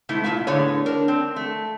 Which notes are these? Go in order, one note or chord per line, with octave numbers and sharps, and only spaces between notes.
G#2 C3 A3 E4
A#2 C#3 F4 E5 A5
A2 D3 B3 G#4 C#5 D5
D4 A#4
C4
A3